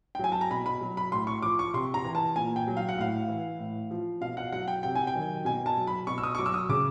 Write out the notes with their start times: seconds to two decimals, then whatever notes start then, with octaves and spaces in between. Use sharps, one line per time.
0.15 G5
0.19 F#3 G#5
0.32 A5
0.41 A#5
0.51 B2 B5
0.66 B5
0.81 F#3
0.97 B5
1.12 A2 C6
1.27 C#6
1.42 F3 D6
1.59 C#6
1.74 C3 C6
1.94 A#5
2.04 E3
2.15 A5
2.36 A#2 G#5
2.56 G5
2.68 F#3
2.77 F5
2.89 F#5
2.98 A2 F5
3.28 E3
3.59 A2
3.91 F3
4.21 B2 F5
4.37 F#5
4.52 F#3 F#5
4.68 G5
4.83 C3 G5
4.95 G#5
5.07 G5
5.15 D#3 F#3
5.45 B2 G#5
5.66 A5
5.77 F#3
5.87 B5
6.07 B2 C#6
6.18 E6
6.23 D#6
6.35 C#6
6.38 F#3 D6
6.46 E6
6.54 D#6
6.69 C#3 D6